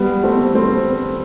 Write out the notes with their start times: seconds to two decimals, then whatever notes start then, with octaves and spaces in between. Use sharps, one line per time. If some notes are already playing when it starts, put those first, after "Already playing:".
Already playing: G3 B3
0.23 A3 C4
0.55 A3 C4